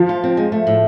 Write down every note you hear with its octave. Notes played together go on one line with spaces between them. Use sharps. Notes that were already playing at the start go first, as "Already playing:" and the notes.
Already playing: F3
F4
C4
G#3
A3
A2